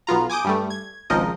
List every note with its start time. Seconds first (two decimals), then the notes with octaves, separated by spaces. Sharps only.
0.07 B1 B3 F4 A#5
0.30 G#5 D6 D#6 G6 D7
0.45 G2 G3 A3
0.70 G#6
1.10 G#1 C#2 F3 D#4 A#4 D#5